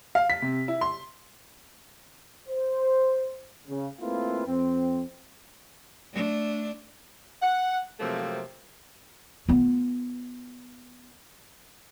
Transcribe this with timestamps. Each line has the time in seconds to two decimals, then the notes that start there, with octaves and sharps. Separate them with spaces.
0.15 F5
0.30 B6
0.42 C3
0.68 E4
0.81 C6
2.49 C5
3.68 C#3
4.01 A3 A#3 C4 E4 F4 B4
4.47 F2 C4
6.12 A3 D4
7.42 F#5
8.00 C3 F3 F#3 A3 A#3 C4
9.48 B3 F4